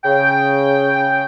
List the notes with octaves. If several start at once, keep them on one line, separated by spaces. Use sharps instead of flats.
C#3 G5